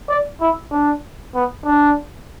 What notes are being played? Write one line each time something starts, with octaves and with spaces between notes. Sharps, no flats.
D5
E4
D4
B3
D4